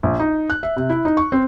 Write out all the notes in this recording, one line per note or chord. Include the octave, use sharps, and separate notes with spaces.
A#1
D#4
F#6
E5
C3
E4
D#4
C#6
C4